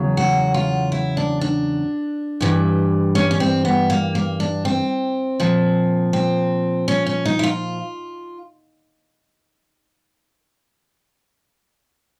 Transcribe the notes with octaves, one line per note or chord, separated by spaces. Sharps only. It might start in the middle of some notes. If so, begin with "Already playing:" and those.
Already playing: E2 C#3 F#3
F#4
F4
E4
D4
D4
G2 E3 G3
C#4
C#4
C4
B3
A#3
A#3
D4
C4
A#2 F3
C4
C#4
C#4
D#4
E4
F4